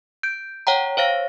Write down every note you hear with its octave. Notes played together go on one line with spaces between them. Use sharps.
G6 D7
C#5 F#5 G5 A#5
C5 C#5 F5 A#6